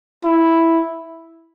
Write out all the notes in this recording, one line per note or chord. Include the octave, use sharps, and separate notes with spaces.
E4